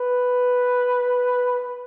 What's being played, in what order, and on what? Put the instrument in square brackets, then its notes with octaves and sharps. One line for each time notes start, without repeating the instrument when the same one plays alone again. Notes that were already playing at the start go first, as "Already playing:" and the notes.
Already playing: [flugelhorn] B4